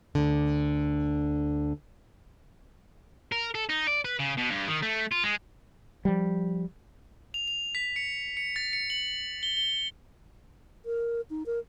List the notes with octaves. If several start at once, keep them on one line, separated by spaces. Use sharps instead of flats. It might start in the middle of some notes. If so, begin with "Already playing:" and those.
D2 D3
A#4
A4
D#4
D5
B4
C#3
B2
G2
D#3
A3
F4
G#3
F3 G3
F7
F7
B6
C#7
C#7
A6
C#7
F#7
G7
G7
A#4
D#4
A#4